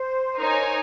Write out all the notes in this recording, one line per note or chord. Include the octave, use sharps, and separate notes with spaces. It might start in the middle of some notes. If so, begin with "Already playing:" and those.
Already playing: C5
D#4 A#4 C#5 G#5